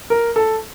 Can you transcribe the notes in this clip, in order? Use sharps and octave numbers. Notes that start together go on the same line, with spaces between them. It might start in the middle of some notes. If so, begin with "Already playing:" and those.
A#4
A4